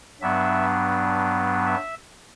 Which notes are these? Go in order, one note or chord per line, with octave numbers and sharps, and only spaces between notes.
G2 F#3 B3 D4 E5
E5